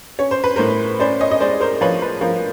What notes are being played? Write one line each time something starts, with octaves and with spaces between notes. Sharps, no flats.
C#4 C#5
C5
B4
A2 A#4 C5
C#4 C5 D5
C#5 D#5
D#5
G#3 C5 D5
A#4 C5
F3 B4 C#5
B4
F3 A#4